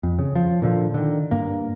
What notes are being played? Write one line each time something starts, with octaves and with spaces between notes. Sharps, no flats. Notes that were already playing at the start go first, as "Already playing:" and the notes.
F2
C#3
F3
A#2 D3 F3
D3 D#3
G2 A#3